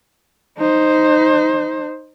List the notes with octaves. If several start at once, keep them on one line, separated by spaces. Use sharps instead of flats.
D#4 C5